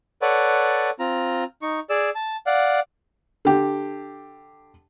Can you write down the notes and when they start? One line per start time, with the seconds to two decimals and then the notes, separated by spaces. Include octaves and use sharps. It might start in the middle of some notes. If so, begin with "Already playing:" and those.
0.22 A4 B4 C#5 D5 F#5
0.99 C4 F4 A#5
1.62 D#4 C#6
1.90 G#4 D5 E6
2.15 A5
2.46 D5 F5 F#5
3.45 D3 G4